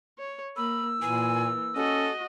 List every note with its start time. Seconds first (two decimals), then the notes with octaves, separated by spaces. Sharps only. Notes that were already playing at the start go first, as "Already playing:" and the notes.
0.18 C#5
0.57 A#3 B5 E6
1.02 A#2 E3 A#3 G#5
1.76 C#4 F#4 A4 D#5